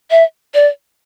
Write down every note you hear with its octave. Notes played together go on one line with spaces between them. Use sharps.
E5
D5